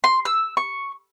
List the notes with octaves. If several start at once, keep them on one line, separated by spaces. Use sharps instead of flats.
C6
E6
C#6